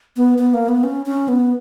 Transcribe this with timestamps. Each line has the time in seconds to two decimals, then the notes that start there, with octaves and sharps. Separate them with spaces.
0.17 B3
0.38 B3
0.54 A#3
0.68 B3
0.84 C#4
1.06 C#4
1.28 B3